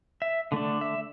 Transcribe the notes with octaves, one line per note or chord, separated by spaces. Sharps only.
E5
D3 A3 D4
E5